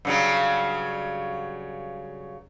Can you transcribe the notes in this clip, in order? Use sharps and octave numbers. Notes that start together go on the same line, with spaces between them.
G2 C#3 F#3